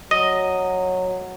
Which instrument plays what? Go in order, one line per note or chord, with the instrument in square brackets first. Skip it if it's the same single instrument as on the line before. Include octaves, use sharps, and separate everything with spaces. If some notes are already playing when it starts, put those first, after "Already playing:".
[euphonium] F#3 [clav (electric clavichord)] D#5